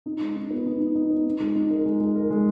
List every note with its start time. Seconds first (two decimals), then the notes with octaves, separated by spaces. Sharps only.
0.06 D#4
0.21 G#3
0.36 D#4
0.50 B3
0.66 D#4
0.80 D#4
0.95 D#4
1.10 B3
1.26 D#4
1.40 G#3
1.55 D#4
1.70 A#4
1.86 G#3
2.00 G#3
2.16 A#4
2.30 G#3